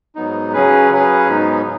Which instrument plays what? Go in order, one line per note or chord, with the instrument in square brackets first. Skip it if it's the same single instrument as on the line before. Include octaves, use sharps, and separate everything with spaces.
[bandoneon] G#2 F#3 B3 D#4
C#3 F#3 C#4 G#4 B4
C#3 F#3 C#4 G#4 B4
G#2 F#3 B3 D#4